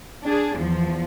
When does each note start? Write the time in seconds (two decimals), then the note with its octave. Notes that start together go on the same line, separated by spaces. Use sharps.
0.24 D4 G#4
0.57 E2 F3